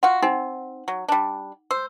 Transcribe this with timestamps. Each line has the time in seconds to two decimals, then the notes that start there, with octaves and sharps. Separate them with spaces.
0.03 F4 F#4 F#5
0.22 C4 D#4
0.88 F#3
1.08 G3 D4
1.71 C5 E6